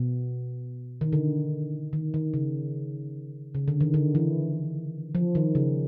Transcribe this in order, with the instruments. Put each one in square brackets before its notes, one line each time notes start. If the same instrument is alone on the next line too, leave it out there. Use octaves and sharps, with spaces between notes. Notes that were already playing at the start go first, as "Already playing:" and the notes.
Already playing: [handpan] B2
D#3
D3
D#3
D#3
C#3
C#3
D3
D#3
D3
E3
F3
D#3
C#3